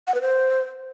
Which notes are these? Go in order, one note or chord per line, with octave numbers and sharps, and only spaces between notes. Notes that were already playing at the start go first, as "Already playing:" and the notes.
F#5
B4
C5